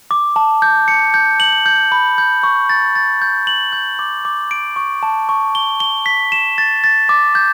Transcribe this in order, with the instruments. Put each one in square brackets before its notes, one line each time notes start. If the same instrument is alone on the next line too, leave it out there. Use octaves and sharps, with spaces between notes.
[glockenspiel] D6
A5
G6
C#7
G6
F#7
G6
B5
G6
C#6
A6
A6
G6
F#7
G6
D6
D6
D7
C#6
A5
C#6
G7
G7
B6
E7
A6
A6
D6
G6